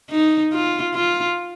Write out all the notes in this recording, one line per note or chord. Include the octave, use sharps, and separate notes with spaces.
D#4
F4
F4